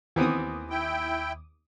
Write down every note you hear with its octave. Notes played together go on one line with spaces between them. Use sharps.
D#2 E3 B3 C4 D6 D#6
E4 G5